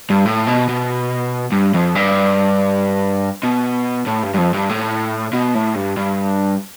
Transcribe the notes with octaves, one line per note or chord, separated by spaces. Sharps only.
G2
A2
B2
B2
G2
F2
G2
B2
A2
G2
G2
F2
G2
A2
B2
A2
G2
G2